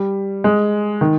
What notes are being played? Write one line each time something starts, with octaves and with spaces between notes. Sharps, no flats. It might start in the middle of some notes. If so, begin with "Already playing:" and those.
Already playing: G3
G#3
D#3